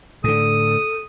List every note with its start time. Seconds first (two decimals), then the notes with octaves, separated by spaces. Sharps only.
0.24 A2 D3 A4 D#6